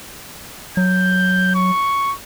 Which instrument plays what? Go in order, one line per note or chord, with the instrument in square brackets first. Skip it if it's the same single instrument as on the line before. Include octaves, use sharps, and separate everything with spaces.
[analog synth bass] F#3 [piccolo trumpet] G6
[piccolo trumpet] C#6